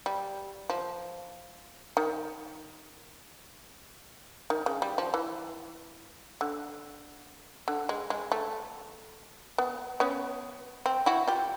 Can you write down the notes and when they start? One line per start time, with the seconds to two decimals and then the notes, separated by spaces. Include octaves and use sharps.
0.06 G3
0.70 F3
1.97 D#3
4.50 D#3
4.66 C#3
4.82 G3
4.98 F3
5.14 E3
6.41 D3
7.68 D3
7.89 G#3
8.10 G#3
8.32 A3
9.58 B3
10.00 B3 C#4
10.86 C4
11.06 E4 F#4
11.28 F4 G4